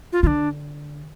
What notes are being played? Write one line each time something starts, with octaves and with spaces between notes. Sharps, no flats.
F4
D3 D4 F4